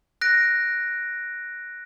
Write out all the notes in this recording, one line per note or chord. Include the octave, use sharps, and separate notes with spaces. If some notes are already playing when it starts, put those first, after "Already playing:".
F#6 A#6 D7